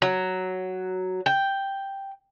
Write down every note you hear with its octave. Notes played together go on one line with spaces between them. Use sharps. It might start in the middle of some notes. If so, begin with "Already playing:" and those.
F#3
G5